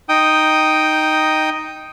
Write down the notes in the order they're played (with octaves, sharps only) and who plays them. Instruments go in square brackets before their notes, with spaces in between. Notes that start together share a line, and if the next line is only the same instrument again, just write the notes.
[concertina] D#4 G5 D#6